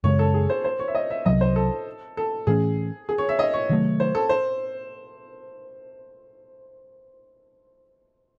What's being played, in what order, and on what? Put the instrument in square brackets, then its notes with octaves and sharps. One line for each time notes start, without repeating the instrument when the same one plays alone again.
[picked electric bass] F#2 C#3 G#3 [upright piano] C#5
[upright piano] A4
G#4
C5
C5
C#5
E5
D#5
E5
[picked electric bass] C2 C3 F#3 [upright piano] D#5
[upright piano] C5
A4
A4
[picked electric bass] A2 E3 A3 C#4 [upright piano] G#4
[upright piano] G#4
C#5
E5
D#5
C#5
[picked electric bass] C3 D#3 F#3 A3
[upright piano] C5
A4
C5